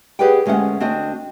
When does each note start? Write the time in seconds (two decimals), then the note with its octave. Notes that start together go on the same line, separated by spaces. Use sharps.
0.19 G4 G#4 B4 D5 F#5 G5
0.46 D2 G#3 C#4 F5 F#5
0.80 D2 C4 D4 F#4 D#5